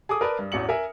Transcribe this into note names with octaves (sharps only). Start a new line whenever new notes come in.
G#4 A4 D6 D#6
A#4 B4 D5 A5
G2
A1 E2 F#4 C#7 F#7
A#4 E5 G#5